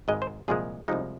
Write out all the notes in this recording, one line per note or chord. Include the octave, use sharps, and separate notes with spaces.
G#1 G#2 G#3 D#5
C5
C2 A#2 F3 G#3 G#4
C2 C3 F3 G#3 D#4